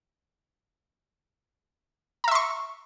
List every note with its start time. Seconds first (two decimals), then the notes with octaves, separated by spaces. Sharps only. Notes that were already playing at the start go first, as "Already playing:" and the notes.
2.24 A#5
2.28 E5
2.31 C6
2.35 C#6